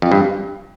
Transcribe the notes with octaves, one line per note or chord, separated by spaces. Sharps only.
F2
G2